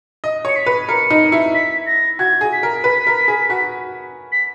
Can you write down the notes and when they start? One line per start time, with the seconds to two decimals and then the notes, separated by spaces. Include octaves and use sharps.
0.24 D#5
0.45 C#5 C#7
0.56 B6
0.66 B4
0.89 A#4 C#7
1.10 D#4
1.32 E4
1.54 B6
1.86 A#6
2.19 F#4 G#6
2.41 G#4
2.52 B6
2.63 A#4
2.84 B4
3.07 A#4
3.28 G#4
3.50 F#4
4.32 B6